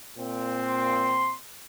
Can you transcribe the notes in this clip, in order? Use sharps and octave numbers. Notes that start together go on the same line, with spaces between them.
A#2 C4
C6